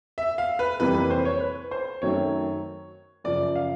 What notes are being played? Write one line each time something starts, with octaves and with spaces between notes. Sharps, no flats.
E5
F5
B4
F2 C3 E3 G3 A#3 B4
B4
C5
C#5
B4
C5
F#2 D#3 F#3 A3 C4 C#5
F#2 C#3 F3 D5
F5